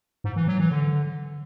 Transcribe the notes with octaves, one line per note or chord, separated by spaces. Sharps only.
G#2
E3
F#3
E3
D3